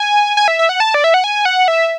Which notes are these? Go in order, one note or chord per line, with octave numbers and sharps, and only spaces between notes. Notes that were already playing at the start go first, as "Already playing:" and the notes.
Already playing: G#5
G#5
E5
E5
F#5
A5
D5
E5
F#5
G#5
F#5
E5